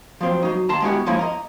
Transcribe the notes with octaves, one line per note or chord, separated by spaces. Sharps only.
F3 F#3 C4
F#3 D#4
D#2 A5 A#5 C6
G#3 B3 E4 F#4 G4
F3 G#3 A#3 C#4 E4
D#5 A#5